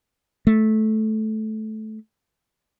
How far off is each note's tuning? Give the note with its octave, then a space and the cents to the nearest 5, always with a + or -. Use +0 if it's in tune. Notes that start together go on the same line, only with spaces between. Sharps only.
A3 -15